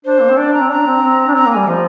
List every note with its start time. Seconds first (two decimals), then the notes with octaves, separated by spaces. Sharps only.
0.05 D4 C5
0.21 A#3
0.29 C4
0.37 D4 D5
0.53 A#5
0.61 C4
0.70 D4 A#5
0.86 C4
1.02 C4
1.28 D4
1.35 C4 A#5
1.46 A#3
1.51 G#5
1.57 G3
1.67 F3 D#5